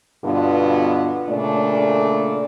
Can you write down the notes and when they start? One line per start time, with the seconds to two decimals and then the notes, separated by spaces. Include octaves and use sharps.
0.24 G2 B2 D3 B3 D4 F4
1.29 A#2 C#3 A3 D4 D5